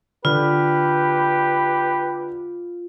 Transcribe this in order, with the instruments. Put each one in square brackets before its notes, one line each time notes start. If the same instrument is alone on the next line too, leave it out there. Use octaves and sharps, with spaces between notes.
[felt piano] D3 [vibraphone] F4 [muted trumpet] G4 [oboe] B4